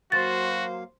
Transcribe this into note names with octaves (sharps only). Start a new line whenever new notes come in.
F#3 A#3 F#4 C5 F5 A6